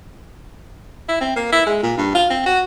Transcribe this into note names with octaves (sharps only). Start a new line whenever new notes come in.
E4
C4
A#3
E4
G#3
A#2
G2
F4
C4
F#4